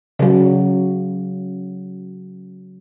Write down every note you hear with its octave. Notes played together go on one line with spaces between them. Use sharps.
C#3 F#3